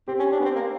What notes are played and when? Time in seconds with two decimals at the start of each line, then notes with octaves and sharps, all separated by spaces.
0.08 C4 G4
0.19 C#4
0.32 D4
0.40 B3
0.44 C4
0.55 A#3